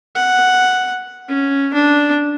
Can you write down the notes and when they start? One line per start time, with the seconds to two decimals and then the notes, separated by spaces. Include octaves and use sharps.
0.15 F#5
1.28 C#4
1.74 D4